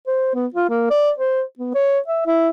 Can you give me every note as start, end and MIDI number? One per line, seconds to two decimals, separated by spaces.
0.07 0.32 72
0.35 0.46 59
0.54 0.68 65
0.69 0.86 58
0.90 1.11 74
1.18 1.43 72
1.59 1.71 59
1.74 1.99 73
2.08 2.26 76
2.26 2.50 64